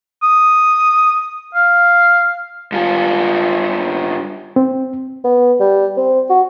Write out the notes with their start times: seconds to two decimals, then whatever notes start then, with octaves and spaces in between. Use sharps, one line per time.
0.23 D#6
1.55 F5
2.72 G2 F4
4.56 C4
5.24 B3
5.60 G3
5.97 C4
6.30 F#4